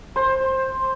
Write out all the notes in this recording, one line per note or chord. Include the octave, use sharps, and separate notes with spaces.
C5